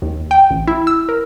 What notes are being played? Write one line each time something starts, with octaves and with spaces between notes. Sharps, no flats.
D#2
G5
A1
E4
E6
A#4